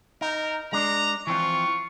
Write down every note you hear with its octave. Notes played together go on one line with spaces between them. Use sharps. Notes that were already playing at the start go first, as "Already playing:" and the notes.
D#4 A#4
G#3 D4 A#5
E3 F3 C4 F4 C#6